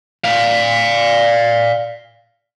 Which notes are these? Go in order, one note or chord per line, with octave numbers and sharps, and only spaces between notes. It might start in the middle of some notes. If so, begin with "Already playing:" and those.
D5 F5